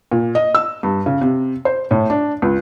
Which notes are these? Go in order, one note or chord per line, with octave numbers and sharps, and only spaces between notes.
A#2
D#5
E6
G2
C#3
C3
C5
A2
D4
C#2